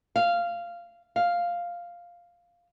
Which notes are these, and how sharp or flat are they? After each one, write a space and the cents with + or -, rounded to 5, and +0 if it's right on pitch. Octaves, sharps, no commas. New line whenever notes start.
F5 -15
F5 +0